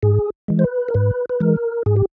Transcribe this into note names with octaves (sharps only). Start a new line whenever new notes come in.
G#2 G#4
E3 G#3
C5
B4
A#4
G#2 B4
B4
E3 G#3 A#4
G#2 G#4
G4